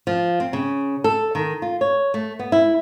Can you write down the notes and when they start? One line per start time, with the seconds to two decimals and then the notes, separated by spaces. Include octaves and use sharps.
0.07 F3
0.40 C4
0.53 C#3
1.04 A4
1.35 D#3
1.62 F4
1.81 C#5
2.14 A3
2.39 B3
2.52 E4